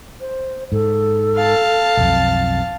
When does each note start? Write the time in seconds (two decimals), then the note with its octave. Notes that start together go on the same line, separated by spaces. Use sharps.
0.20 C5
0.72 G#2 A4
1.36 F5 A5
1.97 B1 F2